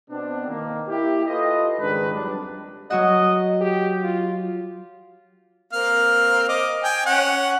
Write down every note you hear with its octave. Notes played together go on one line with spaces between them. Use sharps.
B2 B3 C4 D4
D#3 A#3
A#3 E4 G4
F4 A4 B4 D#5
C#2 G#2 D#3 G#3 D4 B4
F2 F#3 G3 D4
F#3 F#4 D#5 F#5
G4
F4
A#3 C4 F5
D#5 D6
G5 G#5
C#4 F#5